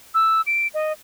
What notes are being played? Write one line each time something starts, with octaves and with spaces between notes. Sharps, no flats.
E6
D7
D#5